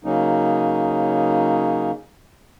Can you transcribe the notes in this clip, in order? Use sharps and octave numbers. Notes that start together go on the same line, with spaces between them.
C#3 F#3 A#3 C#4 D#4